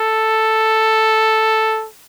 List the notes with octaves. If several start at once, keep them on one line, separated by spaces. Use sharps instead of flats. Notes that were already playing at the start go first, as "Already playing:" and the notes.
Already playing: A4